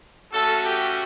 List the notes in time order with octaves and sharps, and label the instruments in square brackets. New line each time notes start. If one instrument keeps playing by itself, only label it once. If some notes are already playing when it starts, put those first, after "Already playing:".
[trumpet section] A3 C#4 F#4 A4
G4